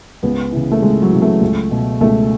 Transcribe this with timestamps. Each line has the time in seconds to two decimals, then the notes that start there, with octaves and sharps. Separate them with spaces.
0.23 C#2 B3
0.52 C#3 E3
0.72 A3
0.82 C#2 G#3
1.02 F#3
1.12 C#3 E3
1.22 A3
1.41 C#2
1.71 B2
2.01 C#2 A3